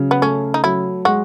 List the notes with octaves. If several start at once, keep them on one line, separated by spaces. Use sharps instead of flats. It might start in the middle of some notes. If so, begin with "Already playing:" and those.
Already playing: C#3 F#3
B3
A3 C#4
D#4
F#3 E4
G#3 F#4